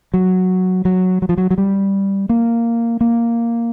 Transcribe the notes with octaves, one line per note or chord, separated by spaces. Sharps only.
F#3
F#3
F#3
F3
F#3
F#3
G3
A#3
A#3